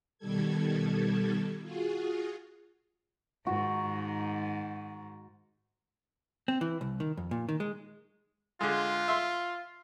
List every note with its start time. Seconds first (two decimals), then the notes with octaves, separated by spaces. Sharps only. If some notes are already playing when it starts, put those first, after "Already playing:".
0.18 B2 D#3 G3 A4 G#6
1.61 F4 F#4 G#4
3.47 G#2 D#3 F#4
6.48 C4
6.61 E3
6.81 C2
7.00 D#3
7.17 F2
7.31 A#2
7.49 D#3
7.60 G#3
8.61 D3 G#3 F4
9.08 E5 C6